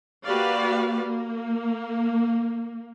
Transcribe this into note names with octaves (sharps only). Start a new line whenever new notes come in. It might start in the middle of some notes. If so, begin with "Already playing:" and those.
A#3 F#4 G4 B4 D5 F5
A#3